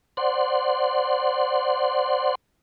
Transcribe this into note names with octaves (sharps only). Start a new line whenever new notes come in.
C5 D5 F#5 C6